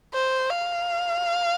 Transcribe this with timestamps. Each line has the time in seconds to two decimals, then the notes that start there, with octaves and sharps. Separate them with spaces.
0.14 C5
0.50 F5